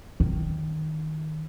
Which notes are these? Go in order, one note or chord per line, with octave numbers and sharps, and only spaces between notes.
D#3